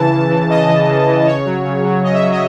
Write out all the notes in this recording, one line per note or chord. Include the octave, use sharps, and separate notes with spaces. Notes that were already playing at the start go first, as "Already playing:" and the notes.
Already playing: C#3 E3 A5
C#3
E3
C#3 D#5
E3
C#3
E3
C#3 C#5
F#3
C#3
F#3
C#3 D#5
E5
F#3
D#5